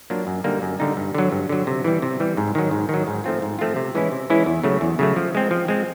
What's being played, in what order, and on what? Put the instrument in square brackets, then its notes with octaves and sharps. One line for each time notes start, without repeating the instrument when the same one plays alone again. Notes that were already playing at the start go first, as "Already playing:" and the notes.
[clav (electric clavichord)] F#3 A#3 D4 F4
F#2
D3 G3 A#3 D#4
F#2
D3 G3 A#3 D#4
G2
D3 F#3
G2
D3 F#3
C3
E3 G3
C3
E3 G3
G#2
D#3 F#3
G#2
D#3 F#3
G#2
F3 A3 C4 F4
G#2
F3 A3 C4 F4
C3
E3 G#3 C#4 E4
C3
E3 G#3 C#4 E4
E2
C#3 F#3 A3
E2
C#3 F#3 A3
F3
G#3 C4
F3
G#3 C4